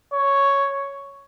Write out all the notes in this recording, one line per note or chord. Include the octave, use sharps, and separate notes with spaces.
C#5